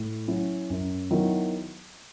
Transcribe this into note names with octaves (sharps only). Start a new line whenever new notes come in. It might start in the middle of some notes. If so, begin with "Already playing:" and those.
Already playing: A2
F#3 C#4 E4
F#2
D#3 F#3 B3 E4